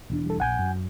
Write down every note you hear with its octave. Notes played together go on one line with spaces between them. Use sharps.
E1 E2 D4
G3 A4
A#1 F#5 G#5 G6
F#2